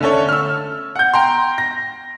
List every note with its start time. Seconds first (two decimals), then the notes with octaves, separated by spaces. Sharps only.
0.01 D3 A3 C#4 A4 C#5
0.29 E6 F6
0.95 F#5 G6
1.14 G5 A#5 C6
1.58 A#6